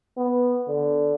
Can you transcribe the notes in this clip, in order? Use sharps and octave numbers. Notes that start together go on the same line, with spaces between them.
B3
D3